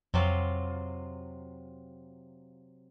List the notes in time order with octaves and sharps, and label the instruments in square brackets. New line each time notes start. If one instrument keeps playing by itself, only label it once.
[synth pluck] F2 [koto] C3 F#3 F4